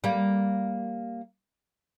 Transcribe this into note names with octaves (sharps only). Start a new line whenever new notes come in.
G3 A#3